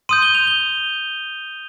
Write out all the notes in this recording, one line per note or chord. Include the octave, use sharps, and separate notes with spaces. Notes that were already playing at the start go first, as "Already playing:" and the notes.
C6 D#6 G6 D#7
G7
F7
G7